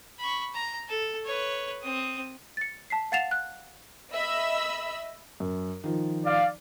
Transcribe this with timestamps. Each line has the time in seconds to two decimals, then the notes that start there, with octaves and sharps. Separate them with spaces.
0.19 B5 C#6
0.54 A#5
0.89 A4
1.25 B4 C#5
1.82 C4 D#6
2.57 A6 C#7
2.90 A5 B6 C7
3.12 F5 F#5 A6 C7 E7 F7
3.31 F#6
4.13 D#5 E5 B5 E6
5.40 F#2
5.84 D#3 F3
6.26 D5 F5